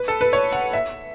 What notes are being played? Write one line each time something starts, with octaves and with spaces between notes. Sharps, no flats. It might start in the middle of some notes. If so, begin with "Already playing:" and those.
Already playing: B4
A4
B4
C#5
F#5
E5